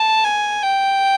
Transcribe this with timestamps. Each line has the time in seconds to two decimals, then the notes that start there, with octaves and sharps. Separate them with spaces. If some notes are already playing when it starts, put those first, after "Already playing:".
Already playing: A5
0.24 G#5
0.63 G5